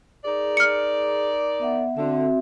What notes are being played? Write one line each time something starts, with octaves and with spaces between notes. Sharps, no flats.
D#4 G#4 A#4 D5
F6 C#7
B3 E5 F#5
D3 C4 F#4 E5